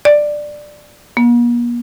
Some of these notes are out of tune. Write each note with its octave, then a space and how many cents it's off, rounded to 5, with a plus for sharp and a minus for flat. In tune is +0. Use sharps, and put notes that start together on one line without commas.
D5 +10
A#3 +45